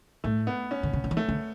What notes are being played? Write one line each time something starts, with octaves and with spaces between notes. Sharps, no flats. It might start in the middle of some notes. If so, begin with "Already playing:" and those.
A2 A3
B3
C#4
D3
C#3
D3
E3
A3
D3